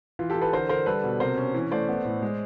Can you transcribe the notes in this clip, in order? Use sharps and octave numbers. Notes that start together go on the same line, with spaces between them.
E3 F4
G4 A4
E3
A4 B4
D3 A#4 C5
D3 A#4 C5
G3 A4 B4
B2
C3 A#4 C5
C#4
E3
A3 C5 D5
B3
A2
G#3